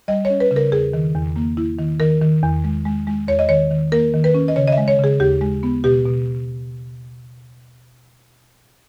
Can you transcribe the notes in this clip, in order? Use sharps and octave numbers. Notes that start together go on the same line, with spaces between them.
G3 D#5
C#5
C#4
B4
C#3
A#4
E2 G#4
D#3
E2
A#3
E4
D#3
D#3 A#4
D#3
E2
G#3
G#3
G#3
E2 C#5
D#5
D#3 C#5
D#3
A#3 A#4
D#3
B4
C#4
D#5
C#3 C#5
D#5
E5
G#3
C#5
C#3 G#4
D#2 G4
G#3
B3
B2 G4
B2